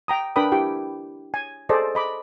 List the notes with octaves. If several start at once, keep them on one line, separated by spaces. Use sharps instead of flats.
G5 A#5 D#6
D4 A#4 B4 G5 B5 D#6
E4 G4 G5
G#5
G#4 A4 C5 D5 D#5
D#5 B5 D6